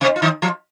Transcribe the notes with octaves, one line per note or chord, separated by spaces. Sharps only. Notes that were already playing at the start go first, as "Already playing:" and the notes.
C3 C4
F4
D#3 D#4
F3 F4